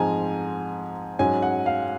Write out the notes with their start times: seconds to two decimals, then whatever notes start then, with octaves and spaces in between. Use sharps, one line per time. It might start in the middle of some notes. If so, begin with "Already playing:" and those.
Already playing: G#2 F3 G#3 C4 G#5 A#5
1.19 G#2 F#3 C#4 G#5
1.42 F#5
1.66 F5